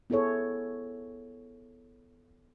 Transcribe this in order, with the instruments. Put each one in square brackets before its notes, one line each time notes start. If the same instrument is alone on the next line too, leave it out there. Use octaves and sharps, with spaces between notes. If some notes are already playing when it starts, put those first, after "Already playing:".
[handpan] B3 E4 G#4 A4 C#5